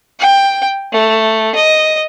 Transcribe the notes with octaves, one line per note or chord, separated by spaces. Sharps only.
G5
A3
D#5